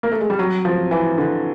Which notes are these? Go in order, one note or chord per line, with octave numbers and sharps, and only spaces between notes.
A#3
A3
G#3
G3
F#3
F3
E3
D3